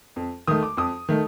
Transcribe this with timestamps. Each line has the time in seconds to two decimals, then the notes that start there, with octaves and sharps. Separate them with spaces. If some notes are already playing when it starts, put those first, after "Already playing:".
0.16 F2
0.47 D#3 A3 D#6
0.63 D6
0.77 F2 D#6
1.09 D#3 A3